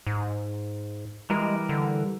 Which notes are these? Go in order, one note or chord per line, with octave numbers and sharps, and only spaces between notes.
G#2
E3 G3 G#3 A#4
D3